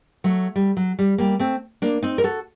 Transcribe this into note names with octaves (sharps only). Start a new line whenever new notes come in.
F#3 A3
G3
F#3
G3
G3 A#3
A3 C4
A#3 D4
C4 D#4
A#4
F#4 A4